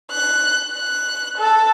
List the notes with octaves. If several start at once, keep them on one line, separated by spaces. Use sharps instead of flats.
F#6
F#6
A4